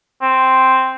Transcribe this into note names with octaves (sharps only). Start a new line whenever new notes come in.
C4